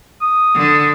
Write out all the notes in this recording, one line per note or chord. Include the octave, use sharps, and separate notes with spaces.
D#6
D3